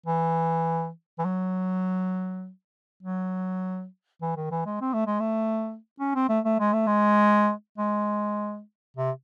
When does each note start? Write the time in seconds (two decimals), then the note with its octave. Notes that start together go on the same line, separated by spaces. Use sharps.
0.06 E3
1.19 E3
1.25 F#3
3.03 F#3
4.22 E3
4.36 D#3
4.51 E3
4.66 G#3
4.81 C4
4.94 A3
5.06 G#3
5.20 A3
6.00 C#4
6.15 C4
6.29 A3
6.45 A3
6.60 G#3
6.73 A3
6.87 G#3
7.78 G#3
8.97 C3